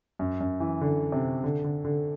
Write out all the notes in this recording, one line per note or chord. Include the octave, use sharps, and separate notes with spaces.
F#2
F#2
E3
D3
C3
D3
D3
D3